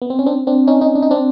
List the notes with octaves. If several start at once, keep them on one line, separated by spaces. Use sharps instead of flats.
B3
C4
C#4
C4 D4
C4 D4
C#4 D#4
C#4 D#4
D4
D#4
C4 D4